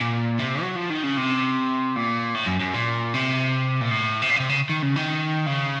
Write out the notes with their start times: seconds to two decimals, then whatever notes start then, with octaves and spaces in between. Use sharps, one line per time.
0.01 A#2
0.39 C3
0.62 F#3
0.76 F3
0.90 D#3
1.03 C#3
1.17 C3
1.96 A#2
2.35 A2
2.47 F#2
2.61 F#2
2.74 A#2
3.14 C3
3.81 A#2
3.91 A2
4.22 C3
4.30 A#2
4.36 C#3
4.40 C3
4.49 C#3
4.70 D#3
4.83 C#3
4.96 D#3
5.47 C#3